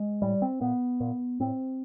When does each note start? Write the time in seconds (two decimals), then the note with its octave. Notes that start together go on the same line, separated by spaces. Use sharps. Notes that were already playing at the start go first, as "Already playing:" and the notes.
Already playing: G#3
0.22 A2 G3
0.42 C4
0.61 A#2 B3
1.00 A#2
1.40 A2 C4